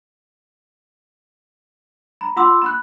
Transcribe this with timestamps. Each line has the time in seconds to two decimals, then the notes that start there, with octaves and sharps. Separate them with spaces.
2.21 A#5 B5
2.36 F4 F#5 B5 C6 D6 E6
2.62 B5 F#6